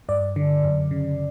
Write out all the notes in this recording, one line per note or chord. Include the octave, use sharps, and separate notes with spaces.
G2 D5
D3
F#2
C#3